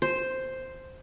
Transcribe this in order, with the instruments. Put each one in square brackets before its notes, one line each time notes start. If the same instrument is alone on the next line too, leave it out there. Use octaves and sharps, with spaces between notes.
[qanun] C5